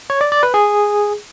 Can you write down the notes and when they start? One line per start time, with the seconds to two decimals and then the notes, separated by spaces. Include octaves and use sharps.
0.10 C#5
0.21 D5
0.32 D5
0.43 B4
0.54 G#4